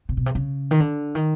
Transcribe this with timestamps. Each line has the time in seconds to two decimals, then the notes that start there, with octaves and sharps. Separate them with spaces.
0.09 C3
0.17 B2
0.26 C3
0.35 C#3
0.71 D#3
0.80 D3
1.15 D#3